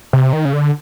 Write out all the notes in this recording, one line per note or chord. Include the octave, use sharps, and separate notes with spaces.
C3
D#3
C#3
D3